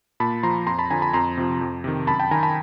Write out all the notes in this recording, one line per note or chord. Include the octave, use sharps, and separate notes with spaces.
A#2 A5 B5
F3 A#5 C6
F2 A#5 C6
A5 B5
D3 F3 G#5 A#5
A5 B5
F2 A#5 C6
C3 F3
F2
C3 D#3
F#2 A5 B5
G5 A5
D#3 G#5 A#5
A5 B5